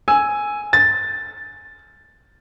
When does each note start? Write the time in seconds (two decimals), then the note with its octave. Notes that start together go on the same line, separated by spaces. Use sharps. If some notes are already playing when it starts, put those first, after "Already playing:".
0.08 G#5 E6
0.73 A6